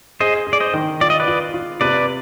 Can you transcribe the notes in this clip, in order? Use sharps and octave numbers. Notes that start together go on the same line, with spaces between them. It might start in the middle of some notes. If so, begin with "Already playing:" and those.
G#4 C5 D#5
G#4
D5
C5 D#5
D#3
F4 D5
D#5
B4 D5
F4
F4
C3 B4 D5